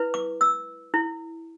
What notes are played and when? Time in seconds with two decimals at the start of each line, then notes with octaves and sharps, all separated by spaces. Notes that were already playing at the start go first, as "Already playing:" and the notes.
Already playing: E4 B4
0.14 D6
0.41 E6
0.94 E4